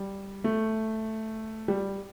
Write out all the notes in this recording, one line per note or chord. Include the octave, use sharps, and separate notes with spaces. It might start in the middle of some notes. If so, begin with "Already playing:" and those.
Already playing: G3
A3
G3